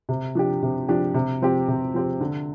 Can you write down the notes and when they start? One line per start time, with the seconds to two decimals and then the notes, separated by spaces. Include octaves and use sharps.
0.09 C3
0.35 F3 D4 G4
0.63 C3
0.89 F3 D4 G4
1.14 C3
1.42 F3 C4 G4
1.68 C3
1.94 F3 C4 G4
2.21 D3